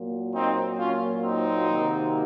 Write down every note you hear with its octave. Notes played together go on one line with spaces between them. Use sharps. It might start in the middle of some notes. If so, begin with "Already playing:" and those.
Already playing: A#2 F#3 A#3
C4 D#4
C#4 F4
C4 D#4
C3 D#3 F#3 A#3